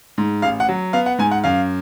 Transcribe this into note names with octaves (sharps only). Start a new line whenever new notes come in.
G#2
A1 F5
F#5
F#3
B3 F5
F#5
G#2 G#5
F#5
F#2 F5